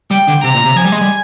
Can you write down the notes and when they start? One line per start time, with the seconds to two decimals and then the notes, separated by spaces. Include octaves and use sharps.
0.11 G3 G5
0.28 D3
0.44 C3 A#5
0.55 A#2
0.65 C3
0.76 F3 G#5
0.84 G3
0.92 G#3
1.01 G3